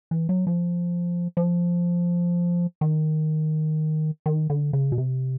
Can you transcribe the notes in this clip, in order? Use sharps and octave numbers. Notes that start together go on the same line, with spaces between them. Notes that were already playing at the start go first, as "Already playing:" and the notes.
E3
F#3
F3
F3
D#3
D#3
D3
C#3
B2
C3